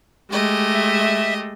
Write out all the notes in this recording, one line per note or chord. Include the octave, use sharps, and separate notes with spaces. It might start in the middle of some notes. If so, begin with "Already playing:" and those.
G#3 A3 G4 D#5
E5